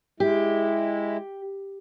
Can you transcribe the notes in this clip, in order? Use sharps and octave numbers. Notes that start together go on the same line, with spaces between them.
G#3 E4 G4